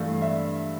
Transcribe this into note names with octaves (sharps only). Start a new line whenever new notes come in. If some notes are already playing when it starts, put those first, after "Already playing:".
Already playing: G2 E3 A3 F5
E5